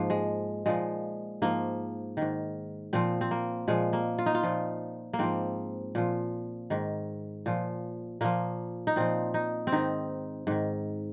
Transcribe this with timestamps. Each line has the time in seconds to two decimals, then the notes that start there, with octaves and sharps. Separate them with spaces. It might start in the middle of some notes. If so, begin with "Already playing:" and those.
Already playing: G#2 F3 A#3
0.10 G#3
0.66 A#2 F3 G#3
1.42 G#2 F3 A#3
2.17 G#2 D#3
2.93 A#2 F3 C4
3.21 C4
3.31 A#3
3.68 A#2 F3 G#3
3.93 A#3
4.18 F4
4.26 D#4
4.35 F4
4.43 A#2 F3
5.13 A#3
5.19 G#2 F3 C4
5.95 A#2 F3
6.70 G#2 D#3
7.46 A#2 F3
8.21 A#2 F3 A#3
8.87 D#4
8.96 A#2 F3 C4
9.34 D#4
9.67 C4
9.72 G#2 D#3 D#4
10.47 G#2 D#3